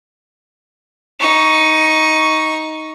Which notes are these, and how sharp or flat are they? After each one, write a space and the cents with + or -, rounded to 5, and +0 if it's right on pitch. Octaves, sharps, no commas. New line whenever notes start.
D#4 +10 C#6 +5